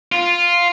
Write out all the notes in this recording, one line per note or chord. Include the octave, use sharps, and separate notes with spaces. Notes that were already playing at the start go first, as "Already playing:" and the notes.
F4